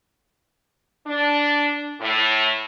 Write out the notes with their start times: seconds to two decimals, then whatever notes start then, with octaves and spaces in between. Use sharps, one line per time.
1.06 D4
2.01 A2